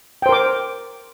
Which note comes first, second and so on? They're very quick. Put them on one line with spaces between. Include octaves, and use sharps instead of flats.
G5 C5 A#4 D6